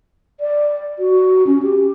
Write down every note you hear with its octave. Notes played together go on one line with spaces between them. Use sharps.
D5
F#4
C#4
G4